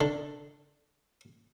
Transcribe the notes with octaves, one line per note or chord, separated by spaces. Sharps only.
D3